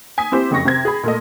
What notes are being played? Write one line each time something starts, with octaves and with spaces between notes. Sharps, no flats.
G#5 D#6 B6
C4 E4 G4 C5
F#1 F2 C#3 C#6 A#6
C3 C5 G#6
G#4 B5
A#2 A3 D#5